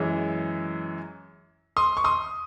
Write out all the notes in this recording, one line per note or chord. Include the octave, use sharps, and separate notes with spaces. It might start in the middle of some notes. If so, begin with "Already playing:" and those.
Already playing: F#2 E3 G#3
C6 D#6
C#6
C6 D#6